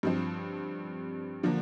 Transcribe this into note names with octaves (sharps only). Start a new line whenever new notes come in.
G2 F3 C4
D3 F3 A#3